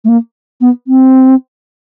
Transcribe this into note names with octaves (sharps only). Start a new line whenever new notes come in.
A3
A#3
B3
C4